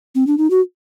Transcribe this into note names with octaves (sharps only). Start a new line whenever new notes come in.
C4
D4
D#4
F#4